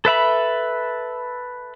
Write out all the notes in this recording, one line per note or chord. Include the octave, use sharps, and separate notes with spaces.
A4 B4 E5 B5